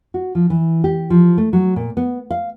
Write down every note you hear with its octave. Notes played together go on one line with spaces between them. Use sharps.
F#4
F3
E3
G4
F3
A3
F#3
A#2
B3
F5